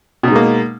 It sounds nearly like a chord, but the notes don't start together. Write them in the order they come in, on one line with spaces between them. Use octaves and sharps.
B2 D#4 G#3 A#3